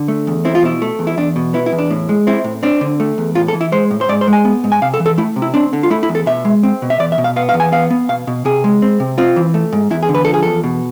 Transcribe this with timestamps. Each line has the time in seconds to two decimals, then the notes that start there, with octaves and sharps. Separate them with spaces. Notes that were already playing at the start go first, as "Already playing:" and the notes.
Already playing: D3
0.08 A3
0.27 E2
0.45 C4 E4
0.55 F4
0.63 B2 E4
0.82 A3
0.99 E2
1.07 E4
1.18 E2 D4
1.36 B2
1.54 B3 E4
1.66 E4
1.72 E2
1.78 D4
1.90 A2
2.09 G#3
2.27 C4 E4
2.44 A2
2.63 C4 D4
2.81 D3
3.00 A3
3.18 E2
3.35 A2 F4
3.48 A4
3.54 E3
3.61 E4
3.72 G#3 C5
3.91 A2
4.01 C5
4.09 G#2 D5
4.21 C5
4.28 G#3
4.33 G#5
4.45 B3
4.64 G#2
4.72 G#5
4.82 C3 F5
4.94 A4
5.00 E3
5.06 A4
5.18 A3 E4
5.36 C3
5.42 E4
5.54 C4 D4
5.73 D3
5.83 F4
5.90 A3 E4
6.03 E4
6.09 E2
6.15 A4
6.26 B2 E5
6.45 G#3
6.63 C4
6.82 B2
6.90 E5
6.99 E2 D5
7.12 E5
7.18 B2
7.24 F5
7.36 B3 F5
7.49 F5
7.54 E2
7.60 G#5
7.72 B3 F5
7.90 B3
8.09 B2 F5
8.27 B2
8.45 C3 G#4
8.64 G#3
8.82 C4
9.00 C3
9.18 C4 F4
9.36 E3
9.54 A3
9.73 G#2
9.90 E2 E4
10.03 G#4
10.09 D3
10.15 B4
10.25 F3 A4
10.34 G#4
10.43 E2 A4
10.64 B2